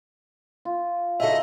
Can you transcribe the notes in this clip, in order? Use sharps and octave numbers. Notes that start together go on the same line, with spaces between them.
F4
D2 C#3 D#4 A4 D#5 E5 G#5